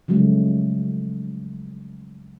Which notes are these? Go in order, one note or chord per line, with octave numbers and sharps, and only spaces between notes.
C#3 F3 F#3 G#3 A3